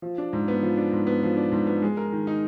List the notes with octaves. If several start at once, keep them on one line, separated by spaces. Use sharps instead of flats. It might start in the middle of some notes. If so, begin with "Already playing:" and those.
F3
D4
G#2
B3
F3
D4
G#2
B3
F3
D4
G#2
B3
G#3
A#4
D#3
D#4